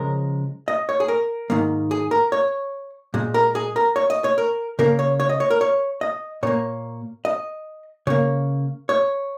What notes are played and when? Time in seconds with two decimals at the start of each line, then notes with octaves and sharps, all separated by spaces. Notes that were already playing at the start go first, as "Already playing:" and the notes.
Already playing: C#3 F3 G#3 A#4
0.68 D#5
0.89 C#5
1.00 G#4
1.08 A#4
1.50 G#2 D#3 A#3
1.91 G#4
2.11 A#4
2.32 C#5
3.14 A#2 G#3
3.34 A#4
3.55 G#4
3.76 A#4
3.96 C#5
4.10 D#5
4.24 C#5
4.38 A#4
4.79 C#3 A#3 A#4
4.99 C#5
5.20 C#5
5.29 D#5
5.40 C#5
5.50 A#4
5.61 C#5
6.01 D#5
6.43 A#2 A#3 C#5
7.25 D#5
8.07 C#3 A#3 C#5
8.89 C#5